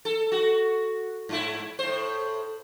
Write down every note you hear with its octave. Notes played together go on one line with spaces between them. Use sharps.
A4
F#4
G#2 E4
A2 C5